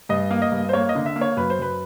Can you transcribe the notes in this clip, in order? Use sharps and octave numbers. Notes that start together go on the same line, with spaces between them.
G2 D#5
A#3
D#5
G2
C5
A#3 C#5
D#5
D3
E5
A#3
C#5
F#2 B4
C5
F#2 B4